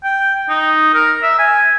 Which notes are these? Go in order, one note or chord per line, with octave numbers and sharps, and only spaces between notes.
G5
D#4
A#4
E5
G#5